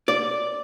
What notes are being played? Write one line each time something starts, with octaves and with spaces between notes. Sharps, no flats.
D5